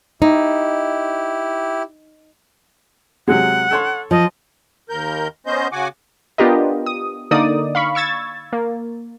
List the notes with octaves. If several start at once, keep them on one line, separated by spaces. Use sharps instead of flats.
D#4 E4 G4
C3 F#3 G#3 F#5
A4 C#5 C6
F3 D#5
D#2 A#4 G6
B3 C#4 C5 D#5 G6
C#3 F#4 F#5 G#5 D6
B3 D4 F4 G4 A#4 D#5
D#6
D3 A#3 D#4 D5 D#6
F5 B5 C#6
C#6 E6 G#6 A6
A#3